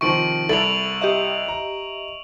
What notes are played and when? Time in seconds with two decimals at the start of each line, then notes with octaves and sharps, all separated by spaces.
0.01 C3 D#3 F3 C#6 D7 F#7
0.49 C2 E4 A4 D7 F7 F#7
1.01 G4 D#5 E5
1.48 A#5